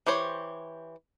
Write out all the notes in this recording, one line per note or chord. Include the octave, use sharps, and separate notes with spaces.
E3 G4 C5 C#5